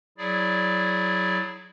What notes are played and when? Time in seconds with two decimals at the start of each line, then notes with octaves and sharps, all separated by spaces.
0.18 F#3 E4 G#4 D5